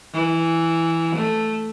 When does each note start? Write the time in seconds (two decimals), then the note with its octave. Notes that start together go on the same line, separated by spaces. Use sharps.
0.14 E3
1.15 A3